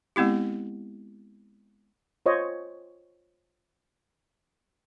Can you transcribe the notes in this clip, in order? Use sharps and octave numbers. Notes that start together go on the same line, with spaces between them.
G#3 B3 C4 E4 G4
F4 C5 C#5 D#5